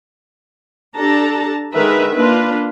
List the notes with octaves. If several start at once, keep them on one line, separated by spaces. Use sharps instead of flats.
D4 G4 A4 A5 A#5
D3 D#3 G#3 A#4 B4 E5
A#3 D4 F4 B4